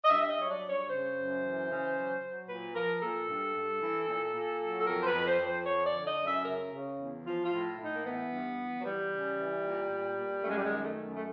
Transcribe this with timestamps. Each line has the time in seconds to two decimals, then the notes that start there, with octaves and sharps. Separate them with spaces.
0.05 D#5
0.09 G2 E5
0.22 E5
0.29 D#5
0.36 F#3 C#5
0.50 D5
0.62 G2
0.70 C#5
0.89 C#3 C5
1.16 F#2
1.42 E3
1.69 C#3
1.95 F#3
2.21 F#3
2.48 A#2 B4
2.74 F3 A#4
3.01 A#2 A4
3.27 G2
3.54 G2
3.80 E3
4.07 A#2
4.34 A#2
4.60 F#3
4.80 A4
4.87 F2 A#4
5.02 C5
5.07 B4
5.13 F2
5.27 C5
5.40 F2
5.47 C5
5.66 F3 C#5
5.87 D5
5.93 D3
6.06 D#5
6.20 F#2
6.26 E5
6.45 C#3 A#4
6.72 C#3
6.99 E2
7.25 F3 F4
7.45 F4
7.52 A2
7.78 A2
7.85 D#4
7.94 A#3
8.05 E3 B3
8.32 G2
8.58 E3
8.81 F#3
8.84 E3 G3
9.10 C#3
9.37 E3
9.64 A#2
9.90 A#2
10.17 A#2
10.43 F#2 A3
10.50 G#3
10.58 G3
10.65 D#3 G#3
10.84 A3
10.96 F#2
11.16 A3